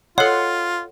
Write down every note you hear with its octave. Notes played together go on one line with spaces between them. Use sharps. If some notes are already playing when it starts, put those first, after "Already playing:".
F4 A4 C#5 D#5 F#5 C6